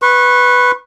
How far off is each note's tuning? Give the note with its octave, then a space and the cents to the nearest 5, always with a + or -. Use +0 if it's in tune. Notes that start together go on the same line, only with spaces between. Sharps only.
B4 +0 C#6 -35